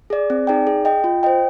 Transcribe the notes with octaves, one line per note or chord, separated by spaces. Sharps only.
G#4 D5
C4
D#4 G#4 D5 G5
G#4
D#5 G5
F4
C5 D#5 G5